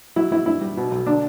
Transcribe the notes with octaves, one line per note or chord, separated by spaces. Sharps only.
F#3 E4
F#3 E4
G2 E4
G3
B2
B1
D3 D4